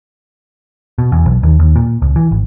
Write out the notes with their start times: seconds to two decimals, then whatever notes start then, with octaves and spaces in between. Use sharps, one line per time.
0.98 B2
1.12 E2
1.26 B1
1.43 D#2
1.59 D#2
1.76 A#2
2.02 C#2
2.16 E3
2.31 G#1